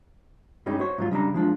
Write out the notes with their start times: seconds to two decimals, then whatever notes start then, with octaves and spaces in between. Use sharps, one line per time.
0.66 G2 G3 G#3 C#4 D#4 G4
0.79 F#4 C5 C#5
0.98 G#2 F#3 F4
1.11 C#3 G3 D4 A#5
1.34 F3 G#3 D4 F4